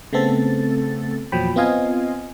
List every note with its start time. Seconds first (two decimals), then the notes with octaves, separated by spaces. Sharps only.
0.13 C#3 A3 B3 C4 A4 A6
1.32 E2 A#2 F3 F#3 G5 B5
1.56 B3 C4 F4 D#5 F5 G#5